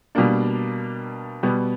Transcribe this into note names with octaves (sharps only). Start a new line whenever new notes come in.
B2 G3 A#3 D4
B2 G3 B3